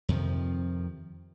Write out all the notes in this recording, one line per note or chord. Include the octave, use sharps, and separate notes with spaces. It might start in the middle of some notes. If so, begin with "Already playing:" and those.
F2 C3 D#3 F3